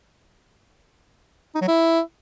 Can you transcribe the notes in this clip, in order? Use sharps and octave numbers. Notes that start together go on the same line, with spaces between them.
D#4
F#3
E4